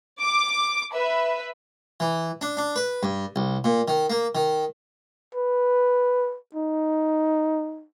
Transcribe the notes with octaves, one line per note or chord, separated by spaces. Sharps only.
D6
B4 E5
E3
D4
D4
B4
G2
C2
A#2
D#3
A#3
D#3
B4
D#4